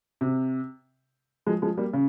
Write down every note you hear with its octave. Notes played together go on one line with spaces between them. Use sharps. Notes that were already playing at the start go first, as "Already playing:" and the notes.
C3
F3 G#3
F3 G#3
G3 A#3
C#3